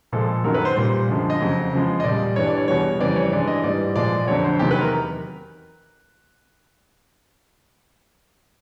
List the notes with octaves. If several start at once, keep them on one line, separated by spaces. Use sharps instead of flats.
A#2 F3 G#3 A4
F#2 D#3 F#3 A#4
B4
C5
A#2 G3 C5
F#2 D3 F3 G#3
D#5
F2 C#3 F#3
E2 C#3 F3 G#3
D#5
A#2 G3 D5
G2 E3 G3 C#5
D5
C#5
E2 B2 G3 C#5
F2 C#3 E3 G3 D5
C#5
G2 E3 G#3 D5
D#5
G#2 E3 G3 D5
A#2 F3 G#3 D5
F2 D3 F#3 C#5
C5
E2 C3 D#3 F#3 G4
B4
A#4